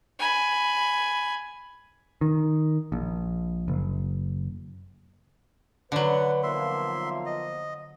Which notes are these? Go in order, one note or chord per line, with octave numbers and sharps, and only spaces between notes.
G#5 B5
D#3
A#1
F#1
D3 F#3 B4 F#5
B1 F3 A#3 E5 C6
D#5